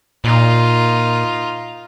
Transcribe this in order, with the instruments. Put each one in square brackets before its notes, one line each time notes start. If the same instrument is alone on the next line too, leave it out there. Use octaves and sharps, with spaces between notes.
[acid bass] A#2 [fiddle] D#4 F4